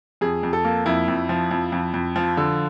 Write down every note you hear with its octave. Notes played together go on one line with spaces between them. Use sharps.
F2 G#4
F2
A4
A#3
F2 E4
F2
F3
F2
F2
F2
F3
D3